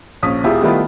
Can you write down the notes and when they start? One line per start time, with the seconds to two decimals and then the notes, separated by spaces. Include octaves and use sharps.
0.23 A#1 C#4 D#6 B6
0.44 E1 E2 E4 F4 G4 G#4
0.62 D#3 G3 A3 B3 E4 F4